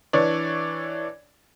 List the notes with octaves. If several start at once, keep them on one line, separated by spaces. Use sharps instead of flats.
E3 D4 C#5 D5